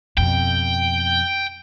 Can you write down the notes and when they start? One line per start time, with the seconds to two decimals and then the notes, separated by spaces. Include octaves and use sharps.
0.18 F2 B2 G5